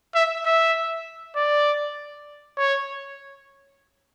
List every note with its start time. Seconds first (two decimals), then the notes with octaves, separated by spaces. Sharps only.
0.15 E5
0.45 E5
1.36 D5
2.58 C#5